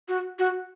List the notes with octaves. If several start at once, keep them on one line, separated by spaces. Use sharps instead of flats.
F#4
F#4